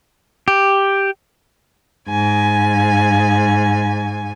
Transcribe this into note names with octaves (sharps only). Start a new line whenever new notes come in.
G4
G#2 G#5